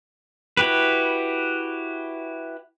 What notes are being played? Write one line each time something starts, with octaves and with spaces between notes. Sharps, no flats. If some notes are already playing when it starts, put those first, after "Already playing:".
E4 F#4 G4 B4